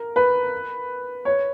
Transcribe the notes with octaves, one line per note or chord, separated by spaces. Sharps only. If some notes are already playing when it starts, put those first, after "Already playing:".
Already playing: A#4
B4
C#5